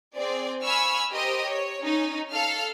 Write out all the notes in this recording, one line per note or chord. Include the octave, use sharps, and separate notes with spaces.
C4 G#4 D5
F5 G#5 B5 C#6 E6 F6
G4 A#4 C5 D#5
C#5
C#4 D#4
A4 F5 F6